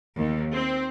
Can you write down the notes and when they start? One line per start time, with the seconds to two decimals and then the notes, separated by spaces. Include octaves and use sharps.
0.16 D#2
0.53 C4